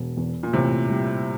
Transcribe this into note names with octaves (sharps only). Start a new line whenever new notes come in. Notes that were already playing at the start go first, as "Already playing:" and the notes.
Already playing: E1
E2
A#2
E2 A2 C3
G3